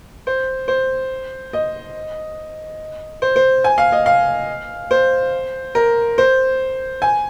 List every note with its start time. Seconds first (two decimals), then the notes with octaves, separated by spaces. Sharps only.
0.27 C5
0.68 C5
1.53 D#5
3.22 C5
3.36 C5
3.64 G#5
3.78 F5
3.92 D#5
4.06 F5
4.91 C5
5.75 A#4
6.18 C5
7.02 G#5